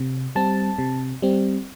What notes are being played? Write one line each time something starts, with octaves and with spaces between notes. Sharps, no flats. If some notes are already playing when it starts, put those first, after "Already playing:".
Already playing: C3
G3 C4 A5
C3
G3 C4